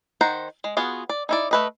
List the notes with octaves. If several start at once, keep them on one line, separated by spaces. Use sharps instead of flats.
D#3 C5 F#5 A#5
G#3
B3 F4 F#4 G#4
D5
D#4 E4 D5
A3 B4 D#5